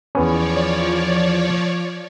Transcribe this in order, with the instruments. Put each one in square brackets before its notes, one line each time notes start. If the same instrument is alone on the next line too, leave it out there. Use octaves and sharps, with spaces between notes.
[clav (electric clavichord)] E2 B3 C#4 [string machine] F3 C#5 D5